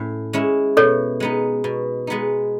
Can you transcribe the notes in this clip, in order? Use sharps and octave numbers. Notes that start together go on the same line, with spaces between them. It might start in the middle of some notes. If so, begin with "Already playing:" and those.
Already playing: A2 C#4
G#3 C#4 E4
B2 A4 C#5
G#3 B3 D#4
B2
G#3 B3 D#4